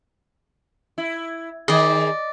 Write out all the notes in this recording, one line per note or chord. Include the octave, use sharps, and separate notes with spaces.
E4
D#3 G#4 D5 D#5